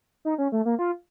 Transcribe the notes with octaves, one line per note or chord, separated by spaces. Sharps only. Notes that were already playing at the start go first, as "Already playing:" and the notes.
D#4
C#4
A3
A#3
F4